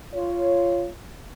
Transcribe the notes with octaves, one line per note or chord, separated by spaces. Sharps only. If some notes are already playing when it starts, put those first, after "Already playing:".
F4 C#5